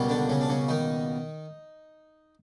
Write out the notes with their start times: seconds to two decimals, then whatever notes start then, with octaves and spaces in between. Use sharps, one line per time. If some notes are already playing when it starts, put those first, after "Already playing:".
Already playing: C#2 B2 G3 A#3
0.09 D3 D4
0.29 C#3 C#4
0.41 D4
0.49 C#3 C#4
0.68 D#3 D#4